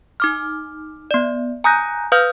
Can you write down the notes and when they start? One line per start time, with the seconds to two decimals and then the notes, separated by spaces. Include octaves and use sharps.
0.20 D#4 D6 F6
1.11 B3 D5
1.64 G#5 A#5 D#6 F#6 G6 A#6
2.12 B4 F5 D#6 F6 G6